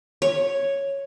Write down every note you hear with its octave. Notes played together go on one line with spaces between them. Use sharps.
C#5